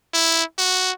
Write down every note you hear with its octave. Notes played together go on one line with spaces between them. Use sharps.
E4
F#4